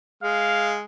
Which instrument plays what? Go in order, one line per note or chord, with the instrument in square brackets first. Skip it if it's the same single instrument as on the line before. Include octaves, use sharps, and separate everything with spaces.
[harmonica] G#3 [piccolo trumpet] F5